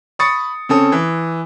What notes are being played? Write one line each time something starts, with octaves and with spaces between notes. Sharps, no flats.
B5 C#6 D#6 A6 C#7
C#3 C4 C#4 A4 D#6
E3